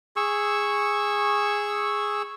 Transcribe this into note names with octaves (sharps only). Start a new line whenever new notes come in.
G#4 C#6 E6